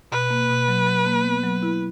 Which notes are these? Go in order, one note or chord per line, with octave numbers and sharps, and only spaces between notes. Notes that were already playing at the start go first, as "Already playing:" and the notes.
B2 B4
A#3
B2
F#3
F#3
A#3
B3
F#3
E4